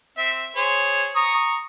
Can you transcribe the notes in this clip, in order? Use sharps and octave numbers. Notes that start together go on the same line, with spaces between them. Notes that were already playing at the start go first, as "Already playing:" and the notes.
C4 E5
G#4 C5 C#5
A#5 C#6 D#6